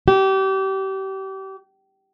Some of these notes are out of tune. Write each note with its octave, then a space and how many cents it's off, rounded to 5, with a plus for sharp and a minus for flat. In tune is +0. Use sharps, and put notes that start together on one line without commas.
G4 -30